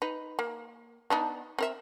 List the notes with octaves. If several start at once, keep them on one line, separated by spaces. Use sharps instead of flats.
D#4 B4
A#3
B3 D4 D#4
C4 A#4 E5